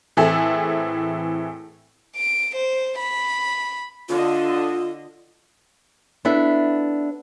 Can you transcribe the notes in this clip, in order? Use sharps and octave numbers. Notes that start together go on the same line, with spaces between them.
A2 E3 C4 E4 G#4 A4
D7
C5
B5
D3 F4 D#5
B3 D4 E4 A4 E5